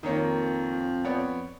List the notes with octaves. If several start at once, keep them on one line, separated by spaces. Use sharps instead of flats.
F2 D#3 A#3 C#5
B3 C#5 D5